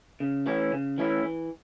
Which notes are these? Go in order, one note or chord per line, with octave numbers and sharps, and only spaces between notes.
C#3
E3 A3 C#4 E4
C#3
E3 A3 C#4 E4
E3